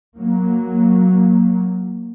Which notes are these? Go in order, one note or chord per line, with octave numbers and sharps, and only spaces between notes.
F#3 A#3